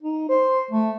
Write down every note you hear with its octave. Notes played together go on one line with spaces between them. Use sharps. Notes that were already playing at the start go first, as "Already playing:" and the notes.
D#4
C5
A3